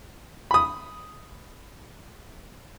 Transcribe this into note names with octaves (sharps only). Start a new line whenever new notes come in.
B5 D#6